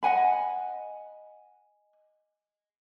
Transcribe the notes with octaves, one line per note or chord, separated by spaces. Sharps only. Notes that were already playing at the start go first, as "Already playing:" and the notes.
D#5 F#5 G#5 B5